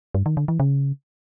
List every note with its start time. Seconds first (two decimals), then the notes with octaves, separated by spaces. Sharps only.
0.15 G2
0.26 D#3
0.37 D3
0.48 E3
0.60 C#3